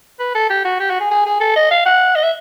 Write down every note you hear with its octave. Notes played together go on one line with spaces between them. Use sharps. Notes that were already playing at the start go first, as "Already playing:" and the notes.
B4
A4
G4
F#4
G4
F#4
G#4
G#4
G#4
A4
D#5
F5
F#5
D#5
E5